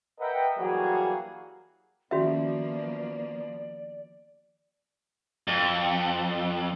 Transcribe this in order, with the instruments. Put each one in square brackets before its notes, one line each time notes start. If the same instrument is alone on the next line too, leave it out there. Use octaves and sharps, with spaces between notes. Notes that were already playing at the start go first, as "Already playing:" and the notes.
[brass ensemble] A#4 B4 D#5 E5 F#5 G5
E3 F#3 G3 A#3 F#4 G#4
[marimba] D#3 C#4 [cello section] F3 A#3 B3 [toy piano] F#4 E5 [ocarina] D5
[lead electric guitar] F2